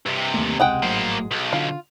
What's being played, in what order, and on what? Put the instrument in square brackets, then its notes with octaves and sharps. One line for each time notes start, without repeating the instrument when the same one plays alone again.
[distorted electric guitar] G2 C3
[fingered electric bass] D#2 A3 A#3
[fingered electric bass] E1 C#2 C3 [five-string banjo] G#3 F#5 G5
[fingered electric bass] G#1 A2 F#3 [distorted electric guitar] A#3 C5
[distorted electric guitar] B1
[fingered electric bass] D3 [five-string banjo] F4